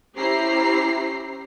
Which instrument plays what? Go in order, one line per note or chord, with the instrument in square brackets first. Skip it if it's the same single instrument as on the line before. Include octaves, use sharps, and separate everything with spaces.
[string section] C#4 E4 G4 C5 A#5 C7